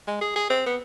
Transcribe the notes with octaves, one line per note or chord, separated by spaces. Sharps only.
G#3
G#4
G#4
C4
B3